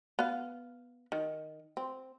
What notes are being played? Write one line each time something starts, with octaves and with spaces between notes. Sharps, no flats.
B3 F5
D#3
C4